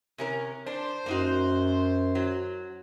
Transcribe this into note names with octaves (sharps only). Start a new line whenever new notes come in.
C3 C#4 A#4
D4 C5
F#2 A#3 D#4 F#4
F#3